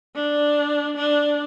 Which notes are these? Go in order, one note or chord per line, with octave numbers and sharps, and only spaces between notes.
D4
D4